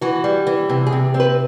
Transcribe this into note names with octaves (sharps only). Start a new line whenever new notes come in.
E3 F#4
G3
E3
C3
G#4
C3
C4
B4